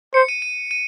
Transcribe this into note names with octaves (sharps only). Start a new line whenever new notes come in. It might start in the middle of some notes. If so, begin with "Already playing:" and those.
C5 C#7
D#7
D#7
D#7